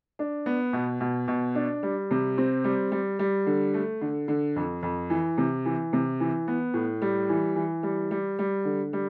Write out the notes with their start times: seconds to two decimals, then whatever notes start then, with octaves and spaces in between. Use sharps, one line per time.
0.19 D4
0.46 B3
0.73 B2
1.01 B2
1.28 B2
1.55 D4
1.83 G3
2.11 C3
2.38 C4
2.64 G3
2.92 G3
3.19 G3
3.46 D3
3.74 A3
4.01 D3
4.28 D3
4.56 F2
4.83 F2
5.10 E3
5.38 C3
5.65 E3
5.93 C3
6.20 E3
6.48 B3
6.74 A2
7.02 G3
7.29 E3
7.56 E3
7.83 G3
8.11 G3
8.39 G3
8.65 D3
8.93 G3